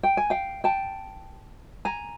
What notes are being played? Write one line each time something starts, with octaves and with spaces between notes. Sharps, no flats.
G5
G#5
F5 G5
G5 A5
G#5 A#5